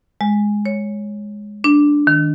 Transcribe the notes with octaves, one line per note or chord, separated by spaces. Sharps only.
G#3
C#5
D4
D#3